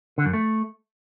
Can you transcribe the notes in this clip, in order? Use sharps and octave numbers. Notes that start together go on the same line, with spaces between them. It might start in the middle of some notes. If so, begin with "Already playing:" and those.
D3
F#2
A3